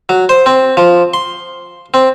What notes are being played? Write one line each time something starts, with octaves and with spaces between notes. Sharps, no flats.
F#3
C5
C4
F3
C6
C4